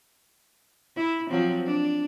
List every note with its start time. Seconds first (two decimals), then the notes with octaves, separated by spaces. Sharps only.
0.96 E4
1.30 F3 F#3 C4
1.66 D4